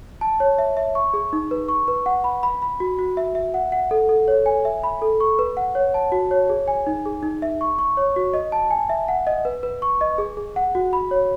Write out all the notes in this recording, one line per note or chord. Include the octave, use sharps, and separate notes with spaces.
A5
C#5
E5
E5
C#6
G#4
D#4
B4
C#6
B4
F#5
B5
B5
B5
F#4
F#4
E5
E5
F#5
F#5
A4
A4
C#5
G#5
E5
B5
A4
C#6
B4
F#5
C#5
A5
F#4
C#5
G#4
G#5
D#4
G#4
D#4
E5
C#6
C#6
C#5
F#4
D#5
A5
G#5
E5
F#5
D#5
B4
B4
C#6
D#5
G#4
G#4
F#5
F#4
B5
C#5